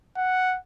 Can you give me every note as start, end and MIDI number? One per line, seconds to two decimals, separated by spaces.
0.16 0.57 78